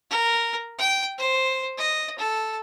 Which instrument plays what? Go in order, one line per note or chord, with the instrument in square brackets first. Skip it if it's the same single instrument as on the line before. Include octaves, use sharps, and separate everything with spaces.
[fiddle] A#4
G5
C5
D#5
A4